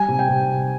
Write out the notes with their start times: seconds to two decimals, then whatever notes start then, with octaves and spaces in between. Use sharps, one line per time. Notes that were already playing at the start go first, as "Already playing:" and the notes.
Already playing: G3 G#5
0.08 C3
0.19 G5
0.29 C3